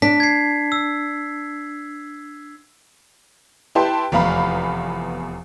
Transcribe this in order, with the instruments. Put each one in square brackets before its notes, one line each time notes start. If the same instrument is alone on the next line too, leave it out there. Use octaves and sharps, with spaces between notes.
[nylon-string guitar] D4 [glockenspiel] B6
[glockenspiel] G#6 C7
E6
[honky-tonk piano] E4 G4 B4 G5 A5 C6
F1 E2 B3 F5 A#5 B5